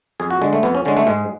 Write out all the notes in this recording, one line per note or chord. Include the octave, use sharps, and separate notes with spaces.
F2 G#4
F#4
D3 G#3
A3
F2 B3
C#4
D3 G#3 C#4
A3
G#2 G#3